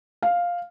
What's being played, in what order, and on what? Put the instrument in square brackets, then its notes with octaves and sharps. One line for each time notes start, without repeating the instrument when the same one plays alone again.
[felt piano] F5